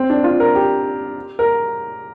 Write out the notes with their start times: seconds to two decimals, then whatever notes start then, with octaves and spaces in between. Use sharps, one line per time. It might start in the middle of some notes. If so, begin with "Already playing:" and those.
Already playing: C4
0.10 D4
0.24 F4
0.40 A#4
0.55 G4
1.39 A#4